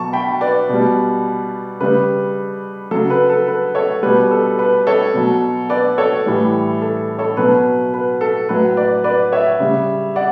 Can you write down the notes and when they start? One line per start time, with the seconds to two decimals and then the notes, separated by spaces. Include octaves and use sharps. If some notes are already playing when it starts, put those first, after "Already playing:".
Already playing: B2 F#3 A5 C#6
0.13 G5 B5
0.41 B4 D5
0.69 B2 G3
1.81 C#3 G3 B4
2.91 C#3 F#3 A4
3.10 B4
3.30 A4
3.48 B4
3.75 A4 C#5
4.03 B2 G3 B4
4.31 A4
4.59 B4
4.87 A4 C#5
5.14 B2 F#3
5.70 B4 D5
5.98 A4 C#5
6.26 A2 E3 G3
6.82 A4
7.19 A4 C#5
7.37 B2 F#3 B4
7.94 B4
8.21 A4
8.49 A2 F#3 B4
8.77 B4 D5
9.04 B4 D5
9.32 C#5 E5
9.60 C#3 G3
10.16 D5 F#5